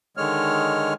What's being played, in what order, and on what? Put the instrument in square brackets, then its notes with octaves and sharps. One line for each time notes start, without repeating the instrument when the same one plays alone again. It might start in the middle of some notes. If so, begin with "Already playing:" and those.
[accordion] D3 D#3 G#3 C#5 F6